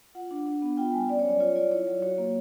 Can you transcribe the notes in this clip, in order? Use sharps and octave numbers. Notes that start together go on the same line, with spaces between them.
F4 F#5
D4
D4
B3
F4 G5
G3 G#5
C#4 D5
C#5
F#3
D5
F4 C#5
F4 D5
E4 C#5
F#3
F#4 C#5
A#3